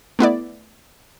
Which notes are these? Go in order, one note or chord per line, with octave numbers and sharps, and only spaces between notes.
A3 B3 E4 D5